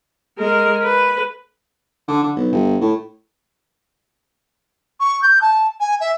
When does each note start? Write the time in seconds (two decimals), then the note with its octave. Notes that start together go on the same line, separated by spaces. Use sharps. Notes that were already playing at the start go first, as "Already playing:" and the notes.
0.38 G#3 A#4
0.83 B4
2.08 D3
2.23 D3
2.35 B1
2.52 G1
2.81 A2
5.00 C#6
5.22 G6
5.41 A5
5.80 G#5
6.00 E5